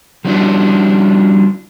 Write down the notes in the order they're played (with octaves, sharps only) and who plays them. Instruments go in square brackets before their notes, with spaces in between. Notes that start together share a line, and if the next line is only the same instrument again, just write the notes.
[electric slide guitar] F3 G3 C#4 D4 E4 F#4